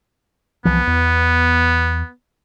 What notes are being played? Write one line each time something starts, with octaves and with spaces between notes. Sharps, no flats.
C2 E3 F3 B3
E2